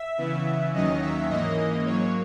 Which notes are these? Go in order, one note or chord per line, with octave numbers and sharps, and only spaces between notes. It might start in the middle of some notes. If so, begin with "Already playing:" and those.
Already playing: E5
C#3 E3 B3
D#2 D#3 F#3 C#4 D#5
E5
G#2 E3 A#3 C#4 D#5
D#5
G#2 F#3 A#3 C#5